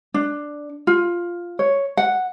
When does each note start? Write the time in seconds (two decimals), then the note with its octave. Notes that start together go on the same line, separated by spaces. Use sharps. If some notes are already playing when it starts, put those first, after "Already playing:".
0.14 D4
0.87 F4
1.59 C#5
1.97 F#5